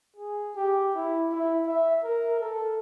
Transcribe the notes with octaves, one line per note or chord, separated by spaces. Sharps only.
G#4
G4
E4
E4
E5
A#4
A4